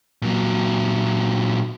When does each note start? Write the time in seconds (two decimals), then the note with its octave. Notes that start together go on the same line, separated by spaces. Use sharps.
0.22 A#2 F#3